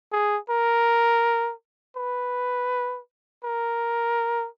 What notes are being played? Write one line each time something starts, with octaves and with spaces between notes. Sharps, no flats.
G#4
A#4
B4
A#4